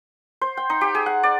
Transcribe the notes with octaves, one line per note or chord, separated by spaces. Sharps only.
C5
G5
D#4
G4
G#4
F#5
D5